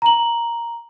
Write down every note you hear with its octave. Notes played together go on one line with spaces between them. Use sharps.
A#5 F#7